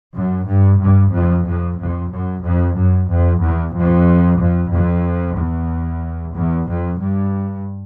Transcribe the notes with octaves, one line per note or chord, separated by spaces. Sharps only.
F#2
G2
G2
F2
F2
F2
F#2
F2
F#2
F2
E2
F2
F2
F2
E2
E2
F2
G2